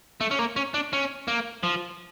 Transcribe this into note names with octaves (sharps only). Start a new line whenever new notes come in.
A3
C#4
A#3
C#4
D4
C#4
A#3
F3